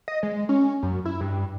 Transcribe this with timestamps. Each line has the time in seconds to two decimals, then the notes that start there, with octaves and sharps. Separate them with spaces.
0.08 D#5
0.23 G#3
0.49 C#4
0.83 F#2
1.05 E4
1.21 G2